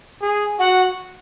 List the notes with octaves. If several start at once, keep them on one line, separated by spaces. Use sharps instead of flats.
G#4
F#4 F#5